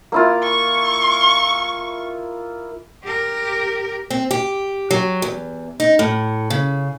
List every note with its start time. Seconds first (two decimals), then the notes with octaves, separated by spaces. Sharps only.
0.12 A#3 E4 F4
0.43 C#6
3.04 G4 A#4
4.10 C4
4.31 G4
4.91 F#3
5.22 E2
5.80 D#4
5.99 A2
6.50 C#3